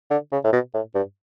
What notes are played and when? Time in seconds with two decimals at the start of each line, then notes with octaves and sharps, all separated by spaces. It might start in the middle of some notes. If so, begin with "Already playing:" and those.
0.11 D3
0.32 C#3
0.44 A2
0.53 B2
0.74 A2
0.95 G2